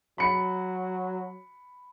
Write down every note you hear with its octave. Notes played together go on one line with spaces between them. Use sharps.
F#3 B5 C#7